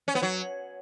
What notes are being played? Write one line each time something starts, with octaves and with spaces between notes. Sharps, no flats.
C#4
B3
F#3